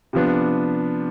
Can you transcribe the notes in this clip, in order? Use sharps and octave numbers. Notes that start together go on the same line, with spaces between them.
C3 F3 B3 D4